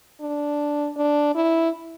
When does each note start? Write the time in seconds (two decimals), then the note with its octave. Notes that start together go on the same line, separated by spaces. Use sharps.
0.21 D4
0.96 D4
1.35 E4